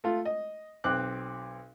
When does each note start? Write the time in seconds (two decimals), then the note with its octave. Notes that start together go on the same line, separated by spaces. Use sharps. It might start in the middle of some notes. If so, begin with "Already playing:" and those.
0.04 A3 F4
0.25 D#5
0.84 B1 C4 D6 F#6